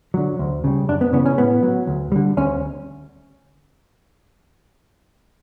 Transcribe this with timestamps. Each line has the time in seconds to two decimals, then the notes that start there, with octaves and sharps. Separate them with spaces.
0.14 D3 F#3
0.39 D2
0.64 C#3 G3
0.88 F#2 D4
1.01 B3
1.13 C#3 E3 B3
1.26 C#4
1.38 A2 B3
1.63 F#3
1.87 D2
2.12 D3 G3
2.37 D2 C#4